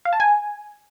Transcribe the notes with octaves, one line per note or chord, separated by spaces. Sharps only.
F5
A5
G#5